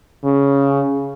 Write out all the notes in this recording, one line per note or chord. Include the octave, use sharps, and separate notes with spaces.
C#3